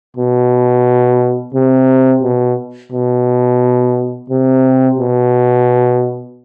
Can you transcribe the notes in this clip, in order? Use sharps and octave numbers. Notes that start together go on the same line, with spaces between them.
B2
C3
B2
B2
C3
B2